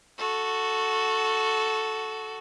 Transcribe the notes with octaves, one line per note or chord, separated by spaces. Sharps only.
F#4 A4